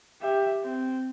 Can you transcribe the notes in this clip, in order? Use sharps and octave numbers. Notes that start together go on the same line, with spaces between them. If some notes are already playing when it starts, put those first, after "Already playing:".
G4 E5
C4